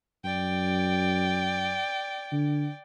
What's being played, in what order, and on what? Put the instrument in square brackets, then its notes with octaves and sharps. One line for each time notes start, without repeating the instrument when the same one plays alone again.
[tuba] F#2 [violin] D5 G5
[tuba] D3